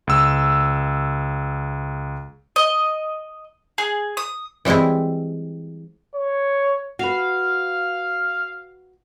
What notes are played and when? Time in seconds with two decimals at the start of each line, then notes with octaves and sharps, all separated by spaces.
0.07 C#2 E6
2.56 D#5
3.78 G#4
4.17 D#6
4.65 E3 G3 G#3 C4 E4
6.15 C#5
6.99 F#4 B4 F5